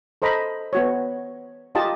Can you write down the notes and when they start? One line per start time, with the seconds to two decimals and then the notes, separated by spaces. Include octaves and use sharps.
0.22 A4 C5 D#5 A#5 B5
0.73 B3 F#4 C#5
1.75 D#4 F4 G4 D#5 A5